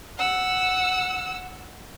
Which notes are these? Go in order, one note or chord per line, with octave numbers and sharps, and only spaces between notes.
F#5 E6